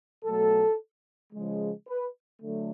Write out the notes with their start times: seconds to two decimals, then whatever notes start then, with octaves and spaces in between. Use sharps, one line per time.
0.24 B2 F#3 A3 A4
1.32 C#3 F3 G#3
1.88 B4
2.41 D3 F#3 A3